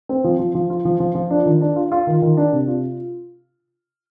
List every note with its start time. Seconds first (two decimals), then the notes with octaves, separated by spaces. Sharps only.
0.09 C4
0.24 F3
0.39 F3
0.55 F3
0.70 F4
0.85 F3
1.00 F3
1.15 F3
1.31 D4
1.46 D#3
1.61 D4
1.76 F4
1.92 F4
2.07 D#3
2.22 D#3
2.37 D4
2.53 C3
2.68 F4